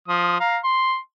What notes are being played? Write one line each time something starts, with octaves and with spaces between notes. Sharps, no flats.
F3 D#6
F5 A#5
C6